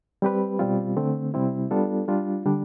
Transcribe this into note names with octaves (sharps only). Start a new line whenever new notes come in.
G3 C4 G4 B4
B2 G3 C4 F4
D3 A3 C4
C3 G3 C4 E4
G3 B3 D4 F4 A4
G3 D4 F4
D3 G3 D4